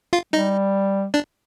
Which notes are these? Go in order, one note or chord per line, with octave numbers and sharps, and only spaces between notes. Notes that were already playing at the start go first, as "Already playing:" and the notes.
F4 F5
G3 D#4 D#5
D4 D5